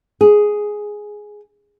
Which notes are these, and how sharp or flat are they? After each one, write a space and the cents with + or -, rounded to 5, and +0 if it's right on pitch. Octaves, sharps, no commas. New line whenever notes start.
G#4 +5